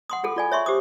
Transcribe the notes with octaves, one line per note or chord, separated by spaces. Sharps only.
F#5 C6 D#6
F4 G#4 A4
F4 D5 G#5
C#5 E5 C6 C#6
G4 C5 D6 D#6